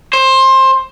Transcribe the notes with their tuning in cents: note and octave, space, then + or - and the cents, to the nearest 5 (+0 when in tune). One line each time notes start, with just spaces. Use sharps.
C5 +20